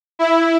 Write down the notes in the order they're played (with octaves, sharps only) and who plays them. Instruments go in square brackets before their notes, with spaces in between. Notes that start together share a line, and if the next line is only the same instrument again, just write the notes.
[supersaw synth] E4